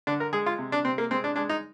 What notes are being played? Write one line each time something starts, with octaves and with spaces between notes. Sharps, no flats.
D3 D4
A#4
G#3 G#4
F4
C3
D4
C3 C4
A#3
G#3 C4
D4
G#3 D4
D#4